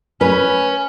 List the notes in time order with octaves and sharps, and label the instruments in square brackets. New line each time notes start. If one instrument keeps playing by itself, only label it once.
[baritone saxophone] C#4 [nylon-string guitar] B4